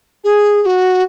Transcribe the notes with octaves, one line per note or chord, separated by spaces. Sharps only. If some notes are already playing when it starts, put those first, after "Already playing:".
G#4
G#4
F#4